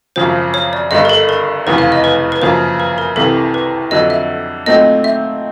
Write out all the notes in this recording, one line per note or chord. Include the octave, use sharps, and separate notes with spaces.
G#1 F#2 C#3 F3 C5
C#5
D5
G1 G2 D3 D#5
A#4
A4
A#4
F1 E2 C#3 E3 B4
F5
D#5
B4
B4
F#2 C#3 F3 A#3 C5
B4
A#4
C2 C3 E3 A4
B4
F2 D3 F#3 D#5
E5
A#2 F#3 A3 C4 D#4 D#5
E5